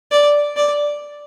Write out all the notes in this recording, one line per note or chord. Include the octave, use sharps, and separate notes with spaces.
D5
D5